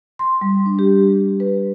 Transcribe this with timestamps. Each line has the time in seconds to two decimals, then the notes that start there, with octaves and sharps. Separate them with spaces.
0.19 C6
0.41 G3
0.66 D4
0.79 G4
1.40 B4